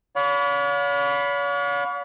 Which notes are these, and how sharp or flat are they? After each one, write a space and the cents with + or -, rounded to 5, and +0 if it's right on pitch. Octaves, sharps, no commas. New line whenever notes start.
C#5 +45 F5 +40 B5 +0